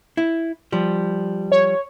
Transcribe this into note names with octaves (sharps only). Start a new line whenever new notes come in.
E4
F3 G3
C#5